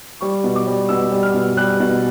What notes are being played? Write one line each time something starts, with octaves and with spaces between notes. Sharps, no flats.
G3 C#6
B2
D6
G3
B2 E6
G3
F6
B2
G3 F#6
B2